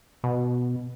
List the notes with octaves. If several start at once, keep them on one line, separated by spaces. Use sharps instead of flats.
B2